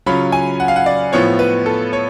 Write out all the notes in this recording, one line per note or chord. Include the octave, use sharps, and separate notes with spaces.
C#3 F#3 C#4 F4 B5
G#5
F#5
F5
F#5
D5
A2 F3 B3 F4 C#5
B4
A4
C#5